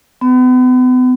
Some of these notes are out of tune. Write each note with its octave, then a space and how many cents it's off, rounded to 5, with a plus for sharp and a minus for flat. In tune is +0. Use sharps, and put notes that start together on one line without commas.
B3 +40